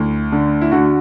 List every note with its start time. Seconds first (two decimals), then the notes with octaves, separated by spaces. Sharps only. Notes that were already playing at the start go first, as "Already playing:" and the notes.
Already playing: D2 E4
0.32 D3
0.61 E4
0.71 D3 F#4